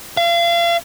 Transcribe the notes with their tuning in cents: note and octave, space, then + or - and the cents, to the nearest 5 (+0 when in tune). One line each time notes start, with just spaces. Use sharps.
F5 -35